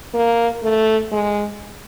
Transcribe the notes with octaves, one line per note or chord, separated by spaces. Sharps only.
A#3
A3
G#3